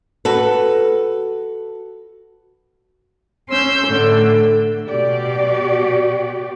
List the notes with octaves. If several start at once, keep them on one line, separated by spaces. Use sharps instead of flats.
F#4 A4 B4
C#4 C6 E6 G6
A2 D3
B2 F#4 G4 D5